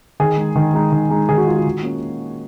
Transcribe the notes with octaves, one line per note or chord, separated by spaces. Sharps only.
D#3 G#4
G#3 D#4
D#3
G#3 D#4
D#3
G#3 D#4
D#3 G#4
F#4
G#3 D#4 F4
F#4
D#3
A#3 C#4